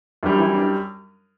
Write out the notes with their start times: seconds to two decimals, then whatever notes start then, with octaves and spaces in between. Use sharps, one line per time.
0.23 F#2 E3 G3 D4
0.39 E3 E4
0.54 D4